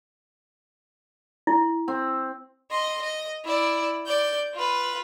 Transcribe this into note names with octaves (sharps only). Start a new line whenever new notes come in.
E4
C4
D#5 C6
D#5
E4 D5
D5 G6
F4 B4